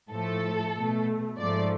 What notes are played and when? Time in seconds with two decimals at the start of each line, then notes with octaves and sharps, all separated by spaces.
0.11 A2 F3 A3 A4
0.75 B2 A3
1.38 G#2 F3 A3 D5